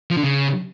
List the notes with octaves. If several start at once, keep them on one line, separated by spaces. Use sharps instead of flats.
F3
D3
C#3